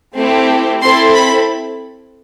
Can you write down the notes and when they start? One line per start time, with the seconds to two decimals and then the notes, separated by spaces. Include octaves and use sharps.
0.16 A3 C4 E4 G4
0.82 C4 E4 A4 C6
1.15 B5